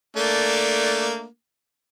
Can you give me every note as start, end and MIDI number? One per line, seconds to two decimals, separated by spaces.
0.17 1.25 57
0.17 1.25 58
0.17 1.25 62